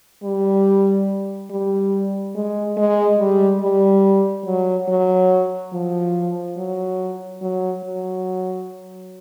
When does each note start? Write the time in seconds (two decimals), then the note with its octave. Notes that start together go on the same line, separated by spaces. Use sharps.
0.23 G3
1.50 G3
2.35 G#3
2.77 G#3
3.19 G3
3.61 G3
4.46 F#3
4.88 F#3
5.73 F3
6.57 F#3
7.42 F#3
7.84 F#3